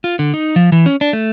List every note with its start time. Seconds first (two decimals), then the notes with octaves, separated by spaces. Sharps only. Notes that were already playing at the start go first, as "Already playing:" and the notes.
0.04 F4
0.19 D3
0.34 D#4
0.56 F3
0.72 E3
0.86 C#4
1.01 D4
1.13 A3